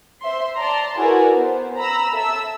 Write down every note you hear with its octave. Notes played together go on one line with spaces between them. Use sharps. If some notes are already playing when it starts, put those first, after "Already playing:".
C5 E5 C6
D5 A5 A#5 C6
E4 F#4 G#4 A#4 B4 D5
B3 C5
A#5 B5 E6
A4 E5 E6